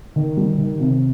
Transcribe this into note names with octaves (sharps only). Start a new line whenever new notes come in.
D#3
G3
D#3
C3